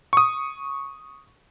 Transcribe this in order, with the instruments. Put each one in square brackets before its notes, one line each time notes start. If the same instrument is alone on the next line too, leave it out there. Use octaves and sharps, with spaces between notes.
[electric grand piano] C#6 D#6